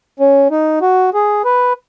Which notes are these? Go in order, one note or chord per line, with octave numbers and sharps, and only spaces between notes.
C#4
D#4
F#4
G#4
B4